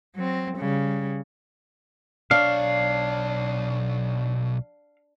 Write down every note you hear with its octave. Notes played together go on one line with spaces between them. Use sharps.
F#3 C4
C#3 G3
B1 D4 C#5 F5